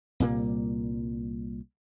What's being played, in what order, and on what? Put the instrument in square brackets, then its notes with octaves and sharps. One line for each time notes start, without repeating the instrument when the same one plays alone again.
[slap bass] C2 A#2 G3 A#3